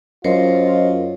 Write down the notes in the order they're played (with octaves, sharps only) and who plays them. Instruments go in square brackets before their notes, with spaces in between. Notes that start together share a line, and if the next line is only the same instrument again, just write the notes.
[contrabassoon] F#2 [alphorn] F4 [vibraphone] A#4 C5 C#5 [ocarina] D#5